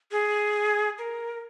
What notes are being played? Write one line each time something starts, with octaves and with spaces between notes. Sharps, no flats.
G#4
A#4